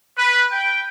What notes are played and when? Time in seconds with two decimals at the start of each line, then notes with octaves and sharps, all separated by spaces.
0.18 B4
0.52 G5